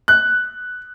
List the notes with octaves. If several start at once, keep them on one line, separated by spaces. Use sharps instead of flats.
F#6